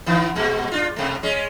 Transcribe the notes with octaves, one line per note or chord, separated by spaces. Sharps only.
D3 E3 B3
A#2 G#3
D4 F4
B2 A3
G#3 C#4